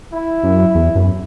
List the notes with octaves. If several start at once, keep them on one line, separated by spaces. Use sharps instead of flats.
E4
F#2
E2
F#2